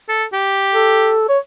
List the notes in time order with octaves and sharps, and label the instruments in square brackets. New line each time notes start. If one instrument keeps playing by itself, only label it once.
[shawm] A4
G4
[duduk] A4
C#5